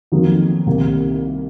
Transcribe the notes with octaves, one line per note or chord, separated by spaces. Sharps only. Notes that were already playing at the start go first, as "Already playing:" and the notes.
F2 D#3 F#3 A#3 D#4
C2 C3 D#3 A#3